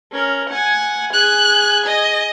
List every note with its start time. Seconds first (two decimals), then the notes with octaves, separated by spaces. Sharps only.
0.12 C#4 A#4
0.50 F#5 G#5
1.14 G#4 G#5 F#6
1.86 D#5